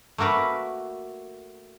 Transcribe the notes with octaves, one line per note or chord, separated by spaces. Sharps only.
A3 A#3 F#4 A#4 B4